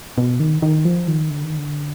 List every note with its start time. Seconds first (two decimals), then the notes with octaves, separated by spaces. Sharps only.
0.18 B2
0.40 D#3
0.62 D#3
0.85 F3
1.08 D#3
1.30 D3
1.44 D#3
1.58 D3